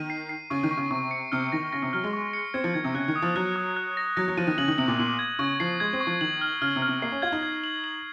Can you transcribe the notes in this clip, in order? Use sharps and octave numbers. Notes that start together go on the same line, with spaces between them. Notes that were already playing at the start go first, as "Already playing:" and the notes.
Already playing: D#3 D#7
C7
C7
C#3 C#6
D#3
C#6
C#3
C3 C#6
C#7
C3 F6
D#3 A#6
C#3 A#6
C3
F#3 F6
G#3
C#6
C#7
C4 G#6
F3
D#3 G#6
C3
C#3 F#6
D#3
D#6
F3
F#3 F#6
D#6
F#6
A#6
F#3 A#6
F#3
F3 D#7
D#3
C#3 F#7
D#3
C3 F#7
A#2
A#2 F#7
G#6
C#3 C#6
F3 C7
G#3 G#6
C4
C#6
F3
D#3 F#7
F6
C#3 F6
C3
F6
C3
A#3 C7
C#4
F4 G#6
D#4
G#6
F#7
F#7